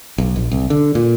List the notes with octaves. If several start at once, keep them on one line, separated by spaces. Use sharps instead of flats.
B1
A#1
C2
D3
A#2